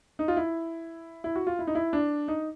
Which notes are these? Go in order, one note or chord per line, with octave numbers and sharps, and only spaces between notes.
D#4
F4
E4
E4
F#4
F4
E4
D#4
E4
D4
D#4